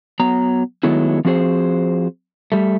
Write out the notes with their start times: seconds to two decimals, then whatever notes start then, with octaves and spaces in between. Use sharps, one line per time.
0.20 F#3 B3 A#5
0.83 D#3 F#3 G#3 A3 B3 E4
1.25 F3 C4 F#4 G#4 C5
2.52 G3 A3